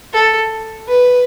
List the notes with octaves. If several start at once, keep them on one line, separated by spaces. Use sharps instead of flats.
A4
B4